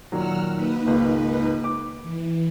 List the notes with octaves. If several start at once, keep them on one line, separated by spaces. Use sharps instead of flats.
A#2 D#3 F#3 F#5 E6 F6
A#3 D#4 B4
G#1 C#2
D6
E3